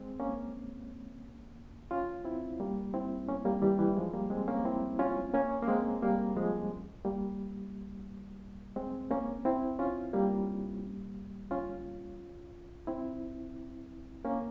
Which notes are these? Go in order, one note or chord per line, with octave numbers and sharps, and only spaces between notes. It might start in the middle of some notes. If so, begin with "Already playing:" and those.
Already playing: G#3 C4
A#3 C#4
C#4 F4
C4 E4
G3 A#3
C4 E4
A#3 C#4
G3 A#3
E3 G3
E3 G3
F3 G#3
G3 A#3
G#3 C4
A#3 C#4
C4 E4
C#4 F4
A#3 C#4
A#3
G#3 C4
G3 A#3
F3 G#3
G3 A#3
G#3 C4
A#3 C#4
C4 E4
C#4 F4
G3 A#3
C#4 F4
C4 E4
A#3 C#4